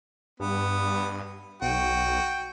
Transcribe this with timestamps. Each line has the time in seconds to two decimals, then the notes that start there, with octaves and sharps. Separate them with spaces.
0.40 G2 B3
1.62 B1 F#4 G5